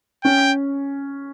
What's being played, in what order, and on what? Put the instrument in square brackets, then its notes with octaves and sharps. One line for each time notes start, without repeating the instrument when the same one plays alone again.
[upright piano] C#4 [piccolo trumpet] G5